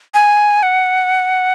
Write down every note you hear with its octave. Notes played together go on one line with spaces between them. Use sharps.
G#5
F#5